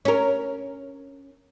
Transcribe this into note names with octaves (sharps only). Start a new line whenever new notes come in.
C#4 A#4